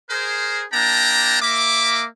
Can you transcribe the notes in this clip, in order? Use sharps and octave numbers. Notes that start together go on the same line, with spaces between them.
G#4 A#4 C5
A#3 D4 E4 G5 A5 A#5
A#3 E5 D6